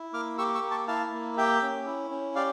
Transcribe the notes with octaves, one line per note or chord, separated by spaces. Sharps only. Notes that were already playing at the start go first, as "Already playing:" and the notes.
Already playing: E4
A#3 D6 F6
G4 C#6 E6
C#6 E6
A#3
A5 C#6
E4 F5 A5
A#3
G4 E5 G5
C#4
E4
C#4
G4 D5 F5